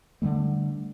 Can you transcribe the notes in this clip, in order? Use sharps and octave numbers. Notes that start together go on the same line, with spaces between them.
D3 E3 G3 A3